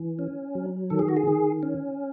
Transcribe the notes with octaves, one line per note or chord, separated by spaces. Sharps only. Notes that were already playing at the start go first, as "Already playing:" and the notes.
Already playing: E3
C#4
F#3
D#3 A4
G#4
F#4
G#4
D#3
C#4